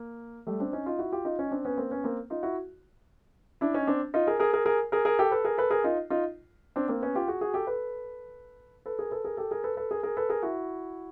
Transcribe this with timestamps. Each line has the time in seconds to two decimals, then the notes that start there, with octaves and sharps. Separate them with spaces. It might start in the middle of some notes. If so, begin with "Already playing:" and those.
Already playing: A#3
0.47 G3 A3
0.60 C4 D4
0.73 C#4 D#4
0.86 D#4 F4
0.99 E4 F#4
1.12 F4 G4
1.25 D#4 F4
1.39 C#4 D#4
1.51 C4 D4
1.65 B3 C#4
1.78 A#3 C4
1.90 B3 C#4
2.04 A#3 C4
2.30 D#4 F4
2.43 E4 F#4
3.61 D4 E4
3.74 C#4 D#4
3.87 C4 D4
4.14 D#4 F4
4.27 G#4 A#4
4.40 G#4 A#4
4.53 G#4 A#4
4.66 G#4 A#4
4.92 G#4 A#4
5.05 G#4 A#4
5.19 G4 A4
5.31 A4 B4
5.45 G#4 A#4
5.58 A4 B4
5.70 G#4 A#4
5.84 D#4 F4
6.10 D#4 F4
6.76 C4 D4
6.88 A#3 C4
7.02 B3 C#4
7.15 F4 G4
7.28 F#4 G#4
7.41 F#4 G#4
7.54 G4 A4
7.67 A4 B4
8.86 A4 B4
8.99 G#4 A#4
9.11 A4 B4
9.25 G#4 A#4
9.37 G4 A4
9.51 G#4 A#4
9.64 A4 B4
9.77 A4 B4
9.91 G#4 A#4
10.03 G#4 A#4
10.17 A4 B4
10.29 G#4 A#4
10.43 E4 F#4